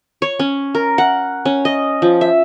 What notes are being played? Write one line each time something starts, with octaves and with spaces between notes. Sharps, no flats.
C#5
C#4
A#4
F#5
C#4
D#5
F3
E5